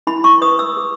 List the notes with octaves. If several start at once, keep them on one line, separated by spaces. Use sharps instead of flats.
E4 B5
C#6
B4 D#6
E6
G#4